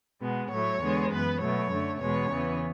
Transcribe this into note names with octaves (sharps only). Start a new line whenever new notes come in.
B2 G#3 B3
A2 F#3 A3 C#5
E2 D3 G#3 B3
F#2 E3 B3 B4
B2 F#3 A3 C#5
F#2 D3 A3
E2 B2 G#3 B3 C#5
E2 C#3 E3 B3